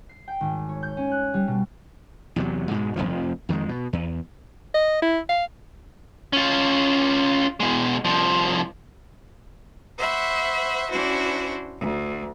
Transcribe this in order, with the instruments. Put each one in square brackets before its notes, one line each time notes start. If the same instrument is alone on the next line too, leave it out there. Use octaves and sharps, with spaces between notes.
[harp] C7
G5
G#1
C#5
G6
C#4
F#6
G3
B2
[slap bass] E2 C3 F#3
G#2 B2 G#3
F1 C2 F2 F3
F2 D#3 E3 G#3
B2
E2
[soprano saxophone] D#5
E4
F5
[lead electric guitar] C#4 F4
B2 G#3
C2 F3
[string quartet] C5 E5 F#5 B5 C#6
C#4 D4 E4 F#4 C5
D2